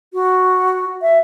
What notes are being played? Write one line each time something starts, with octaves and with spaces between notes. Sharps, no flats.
F#4
E5